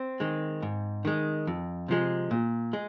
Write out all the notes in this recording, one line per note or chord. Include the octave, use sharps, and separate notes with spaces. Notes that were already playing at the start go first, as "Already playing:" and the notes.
Already playing: C4
D#3 G#3
G#2
D#3 G#3
F2
C3 F3 G#3
A#2
G#3